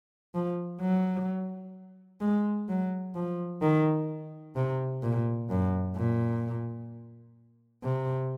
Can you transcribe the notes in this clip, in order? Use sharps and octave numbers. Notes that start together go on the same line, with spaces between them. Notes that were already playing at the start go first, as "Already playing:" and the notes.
F3
F#3
G#3
F#3
F3
D#3
C3
A#2
F#2
A#2
C3